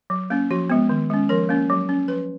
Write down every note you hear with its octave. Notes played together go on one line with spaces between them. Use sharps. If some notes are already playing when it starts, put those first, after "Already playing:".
F#3
A#3 C#4
F3 F#4
G#3 B3
D#3
G#3 C#4
F3 A#4
A#3 C#4
F#3
C#4
F3 B4